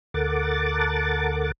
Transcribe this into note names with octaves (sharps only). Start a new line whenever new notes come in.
D2 A4 A#4 F#5 D6 A6